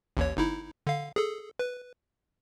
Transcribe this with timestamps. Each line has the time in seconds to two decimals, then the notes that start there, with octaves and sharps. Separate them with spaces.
0.17 A1 D#2 C#5
0.37 G1 D#4 E4
0.87 D3 F5
1.16 G#4 A4
1.59 B4